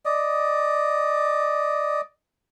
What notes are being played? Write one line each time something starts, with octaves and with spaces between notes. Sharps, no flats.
D5 D#5